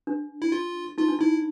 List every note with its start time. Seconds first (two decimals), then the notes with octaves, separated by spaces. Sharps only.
0.07 D4
0.42 E4
0.52 F4
0.97 D#4 F4
1.08 D4
1.19 D#4 E4